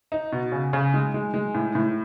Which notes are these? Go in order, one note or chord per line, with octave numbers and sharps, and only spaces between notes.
D#4
B2
C#3
C#3
G#3
G#3
G#3
A2
A2